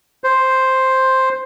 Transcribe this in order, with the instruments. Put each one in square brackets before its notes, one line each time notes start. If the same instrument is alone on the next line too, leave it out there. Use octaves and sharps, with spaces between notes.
[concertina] C5